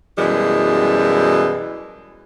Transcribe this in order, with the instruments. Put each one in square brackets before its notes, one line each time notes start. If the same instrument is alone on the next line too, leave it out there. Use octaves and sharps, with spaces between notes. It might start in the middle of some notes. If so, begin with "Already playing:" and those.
[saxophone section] F#2 B2 E3 G3 G#3